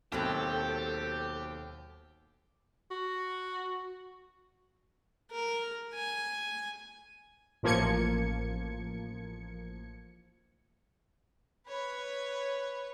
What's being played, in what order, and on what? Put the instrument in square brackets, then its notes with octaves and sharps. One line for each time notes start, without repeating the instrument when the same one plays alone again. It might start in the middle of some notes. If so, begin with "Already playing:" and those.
[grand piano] D#2 [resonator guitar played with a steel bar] B2 F#3 C4 [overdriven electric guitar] G4 [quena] A4
[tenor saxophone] F#4
[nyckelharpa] A#4
G#5
[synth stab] A1 F3 A#3 G#6 C#7
[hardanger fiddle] B4 C#5